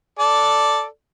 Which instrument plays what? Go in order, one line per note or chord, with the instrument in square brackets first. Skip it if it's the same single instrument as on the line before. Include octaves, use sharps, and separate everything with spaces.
[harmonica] A4 D5